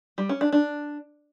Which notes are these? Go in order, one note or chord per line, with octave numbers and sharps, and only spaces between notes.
G3
C#4
D4
D4